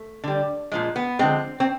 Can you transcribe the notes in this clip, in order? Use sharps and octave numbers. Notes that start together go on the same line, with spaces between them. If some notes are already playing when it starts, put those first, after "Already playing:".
Already playing: A3
D3 G3
A#2 F3 G#3
B3
D3 F3 G#3 C4
C4